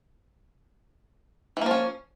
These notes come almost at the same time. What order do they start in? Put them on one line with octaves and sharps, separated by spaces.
E3 A#3 F3 C#4